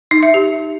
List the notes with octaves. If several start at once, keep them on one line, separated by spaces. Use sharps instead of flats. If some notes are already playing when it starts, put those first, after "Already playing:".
D#4
E5
G4